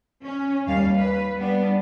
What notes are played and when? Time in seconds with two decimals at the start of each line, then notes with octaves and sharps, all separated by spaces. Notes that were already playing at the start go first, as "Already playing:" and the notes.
0.23 C#4
0.67 D#2 G3 F5
0.96 B4
1.36 G3 B3 D4